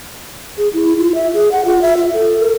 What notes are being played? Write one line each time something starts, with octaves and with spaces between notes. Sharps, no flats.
G#4
E4
F4
E5
G#4
F#5
F4
E5
F4
A4
A#4